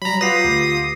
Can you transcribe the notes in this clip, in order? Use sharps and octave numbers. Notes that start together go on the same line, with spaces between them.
F#3 G3 A#5 B5
F4 G4 B4 F#5 D#6 A#6 C7
D2